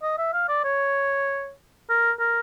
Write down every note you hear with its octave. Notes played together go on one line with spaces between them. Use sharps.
D#5
E5
F5
D5
C#5
A#4
A#4